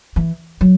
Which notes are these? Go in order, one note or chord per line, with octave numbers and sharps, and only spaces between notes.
E3
F#3